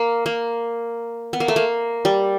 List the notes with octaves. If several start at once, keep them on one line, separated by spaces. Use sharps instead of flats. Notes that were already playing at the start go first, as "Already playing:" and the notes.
Already playing: A#3
A#3
B3
A#3
A3
A#3
G3